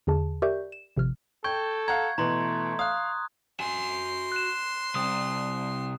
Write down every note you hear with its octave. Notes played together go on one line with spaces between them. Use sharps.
E2 D3 G#4 A5
G4 A#4 D5 E5 C#6 G6
E7
G#1 C3 F3 F6
A4 G5 C#6 G6 G#6
F5 F#5 A#5 G#6
B2 E3 A3 A#5 C6
F5 D#6 F#6
F#4 G#5 C6
F#6 E7
C3 G3 D#6